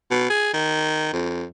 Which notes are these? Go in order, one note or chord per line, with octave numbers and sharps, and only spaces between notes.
B2
G#4
D#3
F2